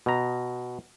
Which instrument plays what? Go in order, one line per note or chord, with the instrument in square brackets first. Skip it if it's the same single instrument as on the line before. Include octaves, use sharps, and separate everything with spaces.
[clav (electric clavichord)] B2 A#5